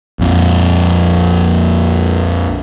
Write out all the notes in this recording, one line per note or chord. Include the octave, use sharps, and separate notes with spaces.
A#1 F2